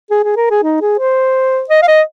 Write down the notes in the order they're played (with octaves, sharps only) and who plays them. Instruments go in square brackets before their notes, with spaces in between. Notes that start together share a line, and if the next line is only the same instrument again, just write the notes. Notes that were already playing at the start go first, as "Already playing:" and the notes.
[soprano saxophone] G#4
G#4
A#4
G#4
D#4
G#4
C5
D#5
F5
D#5